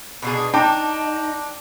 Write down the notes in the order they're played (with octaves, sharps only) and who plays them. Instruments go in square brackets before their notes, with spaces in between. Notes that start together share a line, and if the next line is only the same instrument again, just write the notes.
[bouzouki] B2 D4 G#4
[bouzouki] D4 [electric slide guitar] D#4 [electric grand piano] G5 D6 [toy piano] A5 A#5